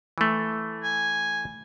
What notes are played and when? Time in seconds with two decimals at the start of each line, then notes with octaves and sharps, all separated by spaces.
0.18 E3 A3
0.83 G#5